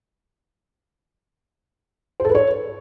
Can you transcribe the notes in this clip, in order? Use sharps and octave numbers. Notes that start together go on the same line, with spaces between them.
C5
A4
B4
C#5